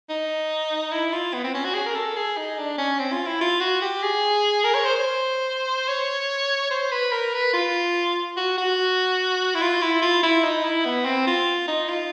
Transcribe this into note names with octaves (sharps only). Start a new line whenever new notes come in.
D#4
E4
F4
B3
C4
C#4
F#4
G#4
A#4
A4
G#4
D#4
D4
C#4
C4
F4
E4
F4
F#4
G4
G#4
A#4
C#5
C5
C5
C#5
C5
B4
A#4
B4
F4
F#4
F#4
E4
F4
E4
F4
E4
D#4
E4
B3
C4
F4
D#4
F4